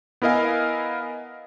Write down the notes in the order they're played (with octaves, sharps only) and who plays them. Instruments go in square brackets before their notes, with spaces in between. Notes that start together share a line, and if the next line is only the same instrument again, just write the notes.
[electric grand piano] B3 E4 A#4 D#5 F5 G#5